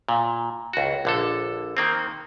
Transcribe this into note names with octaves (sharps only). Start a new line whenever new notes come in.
A#2
C#2 F#4
A#1 D3 A4
D#3 A#3 C4